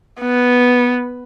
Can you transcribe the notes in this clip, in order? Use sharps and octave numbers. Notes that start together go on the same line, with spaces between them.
B3